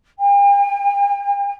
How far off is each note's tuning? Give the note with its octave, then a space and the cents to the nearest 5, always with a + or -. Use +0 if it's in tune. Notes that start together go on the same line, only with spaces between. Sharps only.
G5 +45